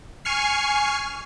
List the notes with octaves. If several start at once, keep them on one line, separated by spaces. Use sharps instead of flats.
G#5 C#6 F6 C7